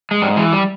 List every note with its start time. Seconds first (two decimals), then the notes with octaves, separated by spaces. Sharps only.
0.11 G#3
0.22 G#2 G3
0.36 E3 G#3
0.53 G3